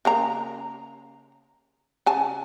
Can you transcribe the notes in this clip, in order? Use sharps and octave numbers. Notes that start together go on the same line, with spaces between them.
C#3 A#3 A#5
C#3 G#5 A5